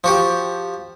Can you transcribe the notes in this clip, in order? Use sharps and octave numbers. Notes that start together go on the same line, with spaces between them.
F3 F#4 G4